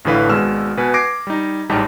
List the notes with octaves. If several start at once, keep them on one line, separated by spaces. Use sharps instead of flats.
A1 A2 D3 E3 B4 F5
G#1 B2 G#3 E6 F6 E7
B2 B4 G#5
D6 G#6 A#6 C7 D7
G3 D#4
A1 G#2 G3 D#4 G4 A5